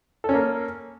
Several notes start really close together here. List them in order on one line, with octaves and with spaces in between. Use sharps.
A4 C#4 A#3